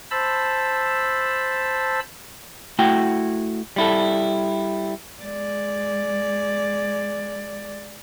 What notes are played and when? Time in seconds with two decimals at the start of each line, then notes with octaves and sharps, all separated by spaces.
0.11 C5 A5 B5 E6
2.79 A3 E4 F#4 G5
3.76 G3 E4 A4
5.23 G#3 D5